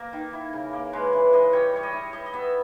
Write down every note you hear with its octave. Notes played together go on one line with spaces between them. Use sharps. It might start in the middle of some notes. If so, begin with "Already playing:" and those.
Already playing: A#3 A#4
D#3
E4
C#3
A#3
G#3 B4
E3
E3 D#5
G3 C#5
G3 C#5
D#5
E4
E4 D#5
D#5
B3 E5